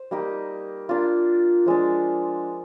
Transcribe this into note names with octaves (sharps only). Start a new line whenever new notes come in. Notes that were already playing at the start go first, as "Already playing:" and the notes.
Already playing: C5
G3 A#3 D#4 G4
A#3 D4 F4
F3 G#3 D4